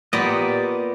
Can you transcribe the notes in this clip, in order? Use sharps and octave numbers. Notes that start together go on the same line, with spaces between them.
A#2 B3 G4 D5 D#5